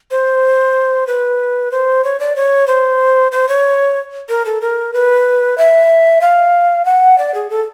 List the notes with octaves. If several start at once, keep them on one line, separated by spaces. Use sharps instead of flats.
C5
B4
C5
C#5
D5
C#5
C5
C5
C#5
A#4
A4
A#4
B4
E5
F5
F#5
D5
G#4
A4